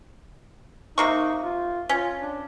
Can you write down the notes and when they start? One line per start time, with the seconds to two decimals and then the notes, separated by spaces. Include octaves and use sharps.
0.98 C3 A#3 D#4 C#6
1.42 F4
1.89 C#4 F4
2.20 D4